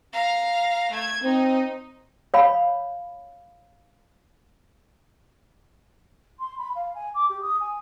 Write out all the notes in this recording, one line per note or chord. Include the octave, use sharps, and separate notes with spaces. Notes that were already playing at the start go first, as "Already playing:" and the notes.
F5 A#5
A3 G#6
C4 D#4
C#5 F5 B5
C6
B5
F5
G#5
D6
G4
D#6
G#5